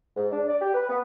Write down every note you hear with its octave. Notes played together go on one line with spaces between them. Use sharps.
G#2
D4
D5
G4
B4
B3